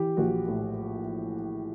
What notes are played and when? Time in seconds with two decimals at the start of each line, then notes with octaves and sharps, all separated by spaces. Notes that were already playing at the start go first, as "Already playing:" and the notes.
Already playing: E3 G4
0.17 A#1 F#4
0.48 A2